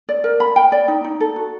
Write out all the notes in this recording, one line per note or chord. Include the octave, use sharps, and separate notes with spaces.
D5
A#4
B5
G5
D5
D#4
D#4
A4
F#4